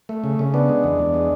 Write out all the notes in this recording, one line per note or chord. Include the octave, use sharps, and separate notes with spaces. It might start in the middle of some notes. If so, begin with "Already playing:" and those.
A3
C#3
C#3
B3 D4
G#3
E2
E2
G#3